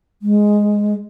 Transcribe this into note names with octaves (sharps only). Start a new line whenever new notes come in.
G#3